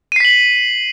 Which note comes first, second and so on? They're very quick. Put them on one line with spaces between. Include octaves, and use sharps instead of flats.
D#7 C7 B6 F#7